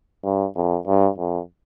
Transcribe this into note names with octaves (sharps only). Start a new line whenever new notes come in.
G2
F2
G2
F2